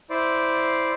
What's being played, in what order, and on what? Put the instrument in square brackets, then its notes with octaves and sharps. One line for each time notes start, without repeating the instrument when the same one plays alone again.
[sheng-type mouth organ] E4 C5 D5